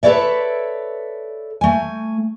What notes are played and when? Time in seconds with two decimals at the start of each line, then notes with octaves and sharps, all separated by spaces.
0.03 A4 B4 C#5 D5 E5
1.61 A3 G#5